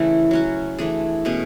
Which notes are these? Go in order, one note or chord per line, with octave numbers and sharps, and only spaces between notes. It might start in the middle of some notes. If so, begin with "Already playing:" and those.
Already playing: C#3 E3 A3 E4
F#3 C#4 F#4
E3 A3 D4 G#4
B2 A3 C#4 G#4